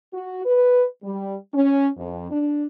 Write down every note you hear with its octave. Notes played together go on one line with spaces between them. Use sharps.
F#4
B4
G3
C#4
F2
D4